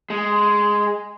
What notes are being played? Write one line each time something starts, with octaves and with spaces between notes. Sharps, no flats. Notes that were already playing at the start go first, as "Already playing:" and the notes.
G#3